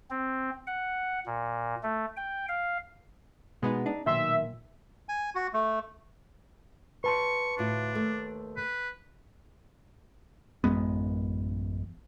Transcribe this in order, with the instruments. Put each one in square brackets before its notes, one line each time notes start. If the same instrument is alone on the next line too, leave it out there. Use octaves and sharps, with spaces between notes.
[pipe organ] C4
F#5
A#2
A3
G5
F5
[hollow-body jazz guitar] B2 D#4 [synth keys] G#3 B3
[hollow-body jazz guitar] D4 D#4
[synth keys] B1 D#3 [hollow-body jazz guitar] A#2 C6 [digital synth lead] E5
[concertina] G#5
F#4
A3
[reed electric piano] B4 A5 C6 [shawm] C#6
[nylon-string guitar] D2 A2 F4 [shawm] D4
[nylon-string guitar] D#2 A3
[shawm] B4
[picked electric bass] A1 F#2 G#3 B3